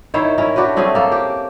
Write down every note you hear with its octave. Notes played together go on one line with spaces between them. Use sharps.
D#3 E4 C5 C#5
C#4 E4 A#4
D4 F#4 G4 B4
A3 C4 C#4 G#4
A#3 A4
G4